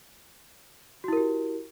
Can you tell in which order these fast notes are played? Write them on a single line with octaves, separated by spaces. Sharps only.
F#4 E4 A#4 G4